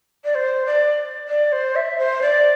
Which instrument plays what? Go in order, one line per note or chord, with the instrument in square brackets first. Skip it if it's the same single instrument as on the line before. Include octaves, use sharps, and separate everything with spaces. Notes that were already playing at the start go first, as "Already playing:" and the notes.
[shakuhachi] D5
C5
D5
D5
C5
E5
C5
D5